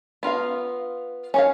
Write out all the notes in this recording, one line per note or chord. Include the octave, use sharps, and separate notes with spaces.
B3 F4 A#4 F5
C#4 C#5 F5